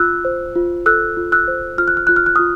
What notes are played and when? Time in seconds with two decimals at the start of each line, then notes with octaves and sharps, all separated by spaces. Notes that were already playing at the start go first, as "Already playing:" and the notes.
Already playing: F4 E6 F#6
0.25 C5
0.55 F4
0.86 A4 E6 F#6
1.17 F4
1.32 E6 F#6
1.48 C5
1.78 F4 F6
1.88 F#6
1.97 F6
2.07 F4 F#6
2.16 F6
2.26 F#6
2.36 F4 D#6 F6